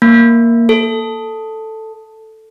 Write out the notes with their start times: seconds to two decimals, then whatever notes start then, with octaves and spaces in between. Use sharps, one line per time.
0.02 A#3
0.69 A4